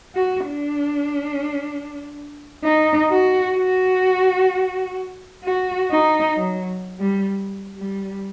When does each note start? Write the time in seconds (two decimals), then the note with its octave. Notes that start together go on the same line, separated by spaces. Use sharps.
0.15 F#4
0.47 D4
2.64 D#4
3.11 F#4
3.57 F#4
5.45 F#4
5.91 D#4
6.37 F#3
7.00 G3
7.78 G3